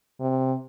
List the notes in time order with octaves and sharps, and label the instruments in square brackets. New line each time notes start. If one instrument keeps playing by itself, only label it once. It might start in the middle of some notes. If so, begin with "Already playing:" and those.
[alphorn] C3